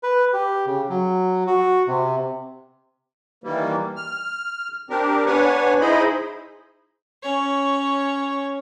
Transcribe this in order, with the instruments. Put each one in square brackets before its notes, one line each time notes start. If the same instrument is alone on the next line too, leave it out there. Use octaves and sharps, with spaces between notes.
[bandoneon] B4
G4
C#3
F#3
F#4
C3
[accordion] D#3 E3 G3 A#3
F6
C4 D4 G4 A#4
B3 D4 B4 C#5 F#5 G#5
D#4 E4 G#4 C5 D#5 B5
[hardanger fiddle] C#4 C#5